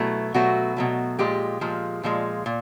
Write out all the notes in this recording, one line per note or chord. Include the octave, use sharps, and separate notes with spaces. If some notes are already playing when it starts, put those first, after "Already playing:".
Already playing: B2 F#3 A3 E4
B2 F#3 A3 F#4
B2 F#3 A3
A#2 F3 G#3 G4
A#2 F3 G#3
A#2 F3 G#3
A#2